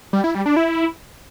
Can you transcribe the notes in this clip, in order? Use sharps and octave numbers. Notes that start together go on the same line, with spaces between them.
G3
E4
G3
D4
E4